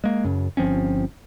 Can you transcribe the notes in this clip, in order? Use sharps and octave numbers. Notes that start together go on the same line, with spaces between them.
G#3 A#3
F#2 C#3
G1 F3 C4 C#4